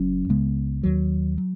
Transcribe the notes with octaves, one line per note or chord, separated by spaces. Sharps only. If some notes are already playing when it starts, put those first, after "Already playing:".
Already playing: F#1 F#2 F#3 C#4
C#2 C#3 G#3 B3
D#2 D#3 F#3
F#3